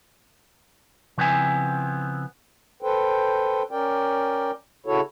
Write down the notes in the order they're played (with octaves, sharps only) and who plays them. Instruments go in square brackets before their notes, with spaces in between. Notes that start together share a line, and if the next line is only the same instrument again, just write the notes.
[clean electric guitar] C#3 F3 B3 C4 E4 G#5
[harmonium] A4 B4 C5 G5
C#4 A#4 D5 G5
C#3 E4 F#4 A4 C#5